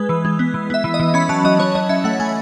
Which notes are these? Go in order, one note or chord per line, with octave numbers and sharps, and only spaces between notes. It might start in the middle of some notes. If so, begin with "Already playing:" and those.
Already playing: G#3 B4
E3
G#3
B3
E3
B3 E5
E3
D#5
E3
C#4 B5
F#3 A5
F#3 D#5
F#3 C#5
F#3 D#5
C#4 E5
A3 F#5
A3 G#5